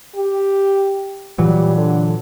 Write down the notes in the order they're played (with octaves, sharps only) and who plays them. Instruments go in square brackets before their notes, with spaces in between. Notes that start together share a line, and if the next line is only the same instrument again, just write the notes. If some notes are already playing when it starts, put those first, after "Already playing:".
[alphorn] G4
[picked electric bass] A#2 E3 F#3 [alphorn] G3
[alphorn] D3